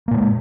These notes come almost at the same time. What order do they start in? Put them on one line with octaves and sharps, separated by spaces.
A#3 A#2 G#3